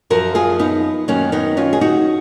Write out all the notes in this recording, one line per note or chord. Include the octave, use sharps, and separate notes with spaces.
F#2 F3 F#4 A#4
F4 G#4
B3 D#4
F#2 D#3 F#3 A#3 C#4
B3 D#4
C#4 F4
G#4
D#4 F#4